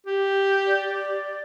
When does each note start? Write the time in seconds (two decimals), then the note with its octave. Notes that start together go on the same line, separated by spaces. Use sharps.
0.06 G4
0.67 D5